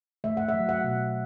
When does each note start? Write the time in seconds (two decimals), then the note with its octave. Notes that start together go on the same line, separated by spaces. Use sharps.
0.24 A3 E5
0.37 F#5
0.49 E5
0.54 F#3
0.69 F#5
0.84 B2